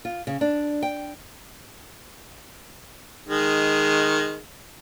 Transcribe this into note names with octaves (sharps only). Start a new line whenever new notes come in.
F4
C#3
D4
G5
D#3 G#3